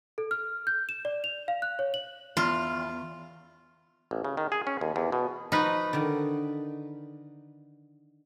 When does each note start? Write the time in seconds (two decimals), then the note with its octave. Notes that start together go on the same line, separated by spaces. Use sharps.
0.18 A4
0.31 F6
0.67 G6
0.89 E7
1.05 D5
1.24 F7
1.48 F5
1.62 F#6
1.79 C#5
1.94 F#7
2.37 E2 F4
4.11 A1
4.25 C#3
4.37 D#3
4.52 G#4
4.67 C#4
4.81 D#2
4.96 E2
5.12 B2
5.52 F3 D#4 F#4 B4
5.93 D3 D#3